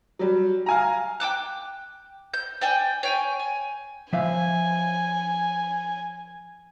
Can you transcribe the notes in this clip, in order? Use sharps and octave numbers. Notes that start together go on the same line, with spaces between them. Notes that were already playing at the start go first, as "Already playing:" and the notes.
F#3 G3
F5 G#5 A#5
G5 A5 D6 F#6
G6
D5 G5 G#5
C#5 G5 G#5
G#5
F3 E5 F5 G#5